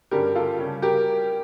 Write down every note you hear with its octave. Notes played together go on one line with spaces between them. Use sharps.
G2 D3 G3 C#4 G4 A#4
F4 A4
C#3 G3 C#4
G4 A#4